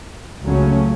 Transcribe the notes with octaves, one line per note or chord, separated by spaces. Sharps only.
C#2 C#3 F#3 A3 C#4